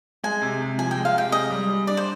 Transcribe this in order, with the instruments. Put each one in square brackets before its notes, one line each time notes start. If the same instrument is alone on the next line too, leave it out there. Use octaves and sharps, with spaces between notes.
[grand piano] G#3 [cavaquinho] G#5
[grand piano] C3
C3
[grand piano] F3 [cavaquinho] G#5
[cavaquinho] G5
[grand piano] G#3
[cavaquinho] F5
[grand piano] C3 [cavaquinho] G5
[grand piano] G#4 [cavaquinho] D#5
[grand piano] G3
G3
[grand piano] D4 [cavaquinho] D5
[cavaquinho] C5